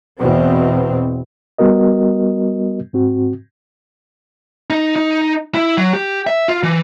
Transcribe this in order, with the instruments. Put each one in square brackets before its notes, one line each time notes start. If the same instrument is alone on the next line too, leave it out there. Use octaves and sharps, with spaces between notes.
[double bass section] E2 B2 C4
[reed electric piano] G3 B3 F#4 A#4 D#5
G#2 C4 F#4
[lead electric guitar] D#4
D#4
E4
F#3
G4
E5
F4
E3